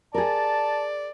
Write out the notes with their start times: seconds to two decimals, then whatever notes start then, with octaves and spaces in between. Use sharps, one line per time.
0.14 G#4 A#4 D5 A5